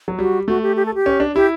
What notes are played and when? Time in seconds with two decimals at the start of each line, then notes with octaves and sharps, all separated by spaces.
0.08 F#3
0.19 G3 F#4
0.48 A3 F#4
0.63 G4
0.76 G4
0.86 A4
0.95 G4
1.06 C#4
1.20 D4
1.35 E4 G4